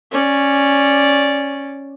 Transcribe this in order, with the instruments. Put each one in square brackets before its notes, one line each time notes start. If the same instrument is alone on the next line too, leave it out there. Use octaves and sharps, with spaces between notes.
[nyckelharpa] C#4 D5